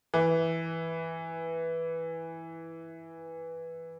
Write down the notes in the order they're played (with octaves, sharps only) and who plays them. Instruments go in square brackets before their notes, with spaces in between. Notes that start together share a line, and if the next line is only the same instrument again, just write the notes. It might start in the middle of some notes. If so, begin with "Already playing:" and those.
[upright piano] E3